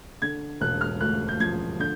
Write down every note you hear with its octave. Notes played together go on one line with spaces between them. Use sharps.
D3 G#6
E1 F#6
F6
D2 F#6
G6
F3 G#6
D3 G6